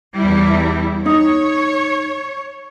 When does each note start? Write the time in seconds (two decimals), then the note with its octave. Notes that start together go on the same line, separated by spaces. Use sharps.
0.14 E2 G3 E4
1.06 D#4 C#5